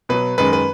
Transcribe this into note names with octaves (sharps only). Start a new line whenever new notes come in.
B2 F#3 B4
F#2 D#3 G#3 B4
B4